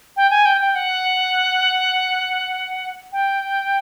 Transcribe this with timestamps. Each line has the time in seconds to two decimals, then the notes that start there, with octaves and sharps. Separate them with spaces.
0.17 G5
0.30 G#5
0.45 G5
0.61 G5
0.75 F#5
3.13 G5